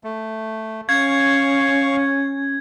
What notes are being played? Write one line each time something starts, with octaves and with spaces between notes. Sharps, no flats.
A3
C#4 F5 C#6 G#6